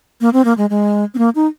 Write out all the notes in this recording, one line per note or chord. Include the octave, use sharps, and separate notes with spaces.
A#3
C4
A#3
G#3
G#3
C4
A#3
D#4